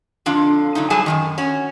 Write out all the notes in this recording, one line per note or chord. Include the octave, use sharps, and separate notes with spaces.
F2 D3 D4 F4
D3 F#3 A3 D#4
F#3 G3 G#4 G#5 A5
F#2 C3 D#3
C#4 F#4